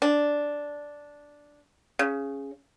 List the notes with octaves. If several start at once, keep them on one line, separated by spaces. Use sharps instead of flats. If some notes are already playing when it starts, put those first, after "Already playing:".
D4
C#3